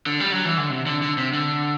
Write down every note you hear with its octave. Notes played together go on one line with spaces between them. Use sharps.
D3
G3
F#3
E3
D3
C3
D3
D3
C3
D3